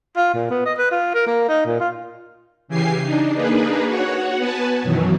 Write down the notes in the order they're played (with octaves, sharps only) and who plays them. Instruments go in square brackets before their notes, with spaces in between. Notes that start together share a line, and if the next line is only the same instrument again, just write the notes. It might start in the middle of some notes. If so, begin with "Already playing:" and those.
[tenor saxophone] F4
A#2
B3
D#5
B4
F4
A#4
A#3
D#4
A#2
F4
[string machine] C#3 E3 G4 G#5 C7
D4 D#4
A#3 D4 D#4 G#4 B4
F#4 C#5 F#5
B3 B4 G#5 A5
F#2 B2 D#3 E3 F#3